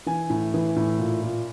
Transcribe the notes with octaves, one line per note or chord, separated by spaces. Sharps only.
E3 G#5
A2
E3
A2
A#2
A#2